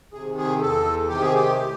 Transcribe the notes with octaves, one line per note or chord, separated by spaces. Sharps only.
C3 D#3 G#4
G#4
E2 A4
C3 D#3 G4
G#4
G4
A2